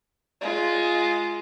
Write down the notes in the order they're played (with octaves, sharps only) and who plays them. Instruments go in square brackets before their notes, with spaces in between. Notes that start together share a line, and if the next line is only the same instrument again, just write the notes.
[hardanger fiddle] G#3 F4